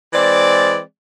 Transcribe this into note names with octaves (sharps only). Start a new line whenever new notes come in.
E3 G#3 C4 D5